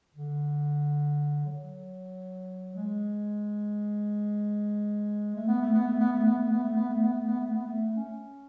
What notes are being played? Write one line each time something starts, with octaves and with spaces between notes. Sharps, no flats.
D3
F#3
G#3
A3
B3
A3
B3
A3
B3
A3
B3
A3
B3
A3
B3
A3
B3
A3
B3
A3
B3
A3
C#4